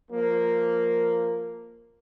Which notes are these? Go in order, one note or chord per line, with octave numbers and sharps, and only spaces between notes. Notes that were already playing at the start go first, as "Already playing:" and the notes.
F3 A#3